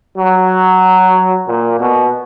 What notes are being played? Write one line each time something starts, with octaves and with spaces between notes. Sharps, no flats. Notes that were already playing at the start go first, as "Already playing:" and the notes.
F#3
A#2
B2